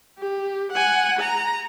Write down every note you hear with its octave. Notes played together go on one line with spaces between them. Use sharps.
G4
F#5 G#5
A#5